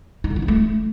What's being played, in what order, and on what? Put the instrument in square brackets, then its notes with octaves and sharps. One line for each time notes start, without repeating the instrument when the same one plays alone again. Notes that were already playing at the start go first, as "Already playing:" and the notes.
[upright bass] D#4
D3
F4
C#4
A3